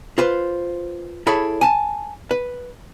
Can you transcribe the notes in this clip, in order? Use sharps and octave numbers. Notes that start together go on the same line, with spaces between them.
F4 B4 C5
E4 G#4 A4 C#5 B5
G#5 A5
B4